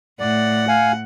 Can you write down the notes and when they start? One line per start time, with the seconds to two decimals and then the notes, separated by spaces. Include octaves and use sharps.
0.20 A2 D5 F#5
0.68 F5 G#5